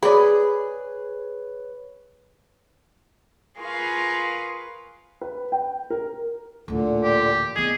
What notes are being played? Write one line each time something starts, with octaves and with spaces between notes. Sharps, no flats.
G#4 B4 C#5 D5 B5
F4 G#4 A#4 B4 F5 C#6
B4
G5
A#4
A1 D2 A#2 D3
G4
E3 B3 G#4 D#5